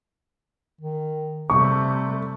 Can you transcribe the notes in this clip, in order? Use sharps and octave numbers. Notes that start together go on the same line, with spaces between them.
D#3
C3 G3 A3 C#6